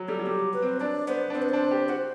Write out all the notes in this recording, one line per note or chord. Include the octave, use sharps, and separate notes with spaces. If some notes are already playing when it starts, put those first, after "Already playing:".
Already playing: F#3
G3 A4
F#3
G3 G4
B4
C4
D4 D5
B3 C5
D4
C4 C5
B4
D4 C5
G4
F#4 C5